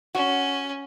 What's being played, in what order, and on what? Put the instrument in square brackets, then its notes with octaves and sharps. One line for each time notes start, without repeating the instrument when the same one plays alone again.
[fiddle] C#4 [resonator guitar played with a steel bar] F#4